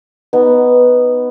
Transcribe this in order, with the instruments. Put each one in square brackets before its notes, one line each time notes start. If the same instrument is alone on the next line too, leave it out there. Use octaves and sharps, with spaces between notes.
[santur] B3 D#4